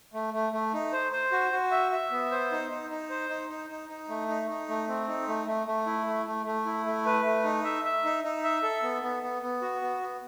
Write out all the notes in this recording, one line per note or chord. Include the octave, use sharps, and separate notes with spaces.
A3
A3
A3
D#4
C5
C5
F#4
F#4
E5
E5
B3
C5
D#4
D#4
D#4
C5
D#4
D#4
D#4
D#4
A3
D#4
D#4
A3
C4
D#4
A3
A3
A3
E4
A3
A3
A3
E4
A3
B4
A3
D#4
E5
E5
D#4
D#4
E5
A4
B3
B3
B3
B3
F#4
B3
B3